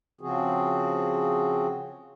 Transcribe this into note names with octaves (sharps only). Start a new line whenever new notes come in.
C#3 F3 C4 F#4 G#4